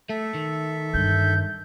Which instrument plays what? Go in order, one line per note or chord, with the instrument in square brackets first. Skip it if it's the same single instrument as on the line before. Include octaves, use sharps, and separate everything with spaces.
[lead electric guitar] A3 [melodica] A4 E5
[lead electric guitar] D#3
[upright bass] G2 D3 [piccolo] G6